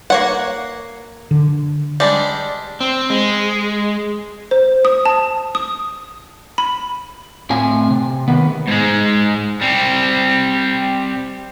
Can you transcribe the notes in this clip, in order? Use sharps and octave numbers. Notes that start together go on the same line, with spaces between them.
A#3 C#5 F#5
D3
G3 G#3 D4
C4
G#3
C5
D#6
A5
D#6
B5
A2 C4 G#5
C3
D#3 B3
G#2 G#3
G3 C4